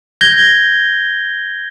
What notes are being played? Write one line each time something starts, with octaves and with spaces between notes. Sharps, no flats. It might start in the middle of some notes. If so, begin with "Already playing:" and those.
G6 G#6 A#6 G7